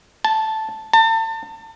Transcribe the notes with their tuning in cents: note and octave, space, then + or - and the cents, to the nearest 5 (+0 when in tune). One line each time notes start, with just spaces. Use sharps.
A5 -5
A5 +35